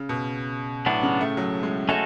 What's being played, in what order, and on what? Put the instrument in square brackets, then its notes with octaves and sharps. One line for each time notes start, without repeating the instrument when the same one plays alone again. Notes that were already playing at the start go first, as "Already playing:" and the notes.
Already playing: [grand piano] C#3
B2
[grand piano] A2 [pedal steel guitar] F#3 B3 D4 F#4
[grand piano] C#3
A3
F#3
G#3
[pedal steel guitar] G#3 C#4 F#4 A4 [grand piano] A3